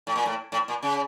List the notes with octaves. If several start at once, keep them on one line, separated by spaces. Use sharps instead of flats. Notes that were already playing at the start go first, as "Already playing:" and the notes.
A2
A#2
A2
A2
A#2
C#3